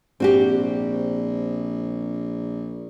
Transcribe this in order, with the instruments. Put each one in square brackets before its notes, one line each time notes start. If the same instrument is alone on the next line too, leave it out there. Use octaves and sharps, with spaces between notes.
[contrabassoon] A#1 [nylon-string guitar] C4 F#4 G4